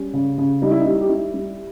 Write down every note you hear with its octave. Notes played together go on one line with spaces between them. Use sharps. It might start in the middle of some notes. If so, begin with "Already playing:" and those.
Already playing: G3 C#4
C#3
C#3
G3 D#4
E4
G3 D#4
G4
G3 E4
G3